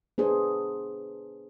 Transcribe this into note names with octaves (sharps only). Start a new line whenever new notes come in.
B3 D4 G#4 C5